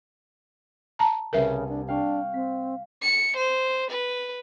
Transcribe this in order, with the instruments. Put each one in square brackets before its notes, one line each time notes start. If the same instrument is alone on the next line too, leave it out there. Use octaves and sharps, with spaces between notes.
[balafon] A5 A#5
[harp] C2 G#5 A5 [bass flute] C#3 [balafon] A#4 B4 E5
[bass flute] D4
[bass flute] D4 [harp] F5 G5 C#6
[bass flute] C4 [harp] B6
[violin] C#7
C5
B4